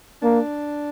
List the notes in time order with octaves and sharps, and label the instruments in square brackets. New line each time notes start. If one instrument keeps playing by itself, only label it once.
[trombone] A#3 [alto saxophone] D4